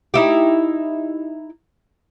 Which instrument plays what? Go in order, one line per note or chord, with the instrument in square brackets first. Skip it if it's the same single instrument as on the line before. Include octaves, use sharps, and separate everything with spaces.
[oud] D#4 E4 G4